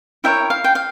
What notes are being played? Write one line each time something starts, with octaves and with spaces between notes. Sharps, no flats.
E4 A#4 C#5 E5 G5
F5
G5
F5